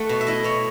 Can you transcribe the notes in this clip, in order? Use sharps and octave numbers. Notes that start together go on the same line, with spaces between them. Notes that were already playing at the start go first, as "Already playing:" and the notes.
Already playing: A3 F#5
B2
E5
E4 D#5
B2 C#5